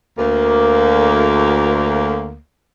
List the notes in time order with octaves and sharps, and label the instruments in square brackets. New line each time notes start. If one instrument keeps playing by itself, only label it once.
[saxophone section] D2 A#3